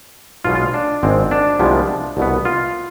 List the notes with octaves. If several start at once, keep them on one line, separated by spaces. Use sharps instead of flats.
B1 B2 G#3 F4
F4
D4
G#1 G#2 G#3 C4
D4
C2 C3 F3 G#3 B3
C2 B2 B3
F4